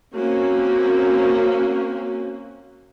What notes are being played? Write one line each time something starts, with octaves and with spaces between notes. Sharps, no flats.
A#3 C4 C#4 F#4